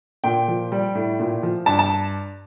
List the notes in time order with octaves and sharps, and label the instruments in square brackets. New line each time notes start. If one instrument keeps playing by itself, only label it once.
[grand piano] A#2 G5
F3
G3
A2
A#2
F3
G2 A5
A5